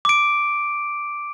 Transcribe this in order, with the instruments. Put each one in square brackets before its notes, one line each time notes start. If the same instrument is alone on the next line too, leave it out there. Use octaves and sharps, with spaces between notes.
[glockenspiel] D6 D7